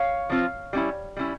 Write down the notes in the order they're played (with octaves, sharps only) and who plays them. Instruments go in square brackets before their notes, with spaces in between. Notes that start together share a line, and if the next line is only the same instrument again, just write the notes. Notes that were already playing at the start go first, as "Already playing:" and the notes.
Already playing: [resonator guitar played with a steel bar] C#5 F5
F3 C4 F4
G3 C#4 E4
G3 C#4 E4